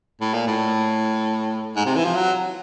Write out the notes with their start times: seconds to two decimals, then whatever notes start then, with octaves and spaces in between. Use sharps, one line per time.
0.21 A2
0.34 A#2
0.47 A2
1.76 G#2
1.86 C3
1.96 E3
2.05 F3
2.15 F#3